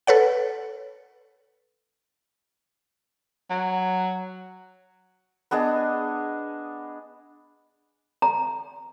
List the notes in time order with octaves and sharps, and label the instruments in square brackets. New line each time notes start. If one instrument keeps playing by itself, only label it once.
[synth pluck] A4 B4 C#5 F#5
[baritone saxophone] F#3
[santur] B3 D4 G#4 D#5
[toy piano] A#5